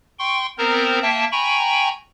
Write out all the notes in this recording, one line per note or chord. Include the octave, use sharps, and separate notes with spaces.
G5 C6 C#6
B3 C4 A#4 C5 A#5
A#3 E5 G5 A5
G5 G#5 A#5 B5 C#6